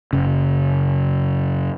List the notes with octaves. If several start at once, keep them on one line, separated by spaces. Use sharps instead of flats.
F#1 C#3